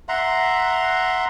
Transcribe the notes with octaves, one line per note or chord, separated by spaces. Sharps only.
E5 F#5 A#5 C6